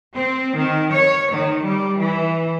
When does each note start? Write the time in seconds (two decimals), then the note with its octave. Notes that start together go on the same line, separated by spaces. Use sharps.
0.14 C4
0.56 D#3
0.93 C#5
1.32 D#3
1.65 G3
2.01 E3